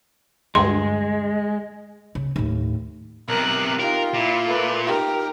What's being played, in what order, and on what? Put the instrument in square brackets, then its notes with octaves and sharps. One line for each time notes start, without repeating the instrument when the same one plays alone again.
[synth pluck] D2 G2 [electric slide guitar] G#3 [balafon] C6
[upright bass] C#3
D#2 A2
[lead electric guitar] B1 C3 [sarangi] A#4 [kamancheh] F#6
[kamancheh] D#4 G4 [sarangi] F4 [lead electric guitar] A#4
[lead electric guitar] A#2 [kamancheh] E4
[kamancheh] A3 B4
[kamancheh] D#4 G4 [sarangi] A#4